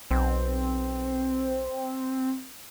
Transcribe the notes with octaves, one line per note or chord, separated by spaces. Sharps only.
B1 C4